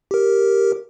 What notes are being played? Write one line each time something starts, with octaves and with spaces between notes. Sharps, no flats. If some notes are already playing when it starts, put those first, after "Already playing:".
G4 A#4